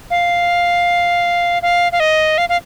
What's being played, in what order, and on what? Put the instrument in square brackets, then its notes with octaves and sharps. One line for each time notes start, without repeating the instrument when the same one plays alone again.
[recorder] F5
F5
F5
D#5
F5
F5